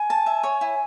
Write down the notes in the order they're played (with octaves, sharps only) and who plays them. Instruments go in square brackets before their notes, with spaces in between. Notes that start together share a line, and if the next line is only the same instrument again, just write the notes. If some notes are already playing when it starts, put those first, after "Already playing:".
Already playing: [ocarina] G#5
[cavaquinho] A5
E5
C#5
E4